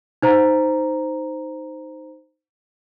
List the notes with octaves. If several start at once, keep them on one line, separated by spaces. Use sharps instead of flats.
D#4 C5 A#5